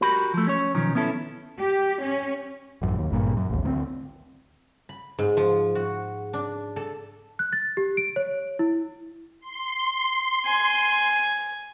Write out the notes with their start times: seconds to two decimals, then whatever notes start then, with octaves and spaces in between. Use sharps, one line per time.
0.01 F#4 G4 A#4 B5
0.34 F3 A3
0.47 C#4 C#5
0.75 B1 D#3 F3 C#4
0.95 B3 C#4 E4 A4
1.59 G4
2.02 C#4
2.82 A1 F#2
2.98 D#2
3.11 G#1 G2 A#2
3.37 F#2
3.50 A1 D#2
3.63 D2 F#3 C4
4.89 B5
5.19 G#2
5.37 F3
5.75 F#4
6.33 D4
6.76 A4
7.39 F#6
7.53 A6
7.77 G4
7.97 D7
8.16 C#5
8.59 E4
9.40 C6
10.46 G#5